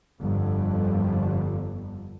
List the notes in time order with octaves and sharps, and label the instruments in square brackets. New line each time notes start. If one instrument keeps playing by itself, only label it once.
[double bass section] G1 F2 D3 G3